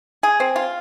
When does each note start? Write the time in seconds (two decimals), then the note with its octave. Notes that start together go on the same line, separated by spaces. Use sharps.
0.23 G#4
0.40 C4
0.56 F4